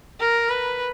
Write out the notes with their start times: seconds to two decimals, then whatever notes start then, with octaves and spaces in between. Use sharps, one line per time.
0.20 A#4
0.50 B4